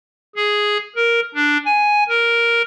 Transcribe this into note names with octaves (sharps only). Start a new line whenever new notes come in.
G#4
A#4
D4
G#5
A#4